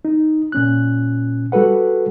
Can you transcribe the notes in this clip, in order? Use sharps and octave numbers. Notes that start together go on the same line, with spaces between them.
D#4
A#2 C#4 F#6
G3 F#4 A4 B4 F#5